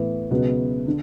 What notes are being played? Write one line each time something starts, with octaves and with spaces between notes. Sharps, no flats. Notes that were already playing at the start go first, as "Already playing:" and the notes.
Already playing: A2 E3 B3
C#2 B2 F#3 B3
D3